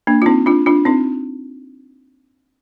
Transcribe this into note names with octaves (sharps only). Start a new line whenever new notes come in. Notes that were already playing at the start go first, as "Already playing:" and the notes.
A#3 D4
F4
C4 D#4
D4 F4
D4 F4
C4 D#4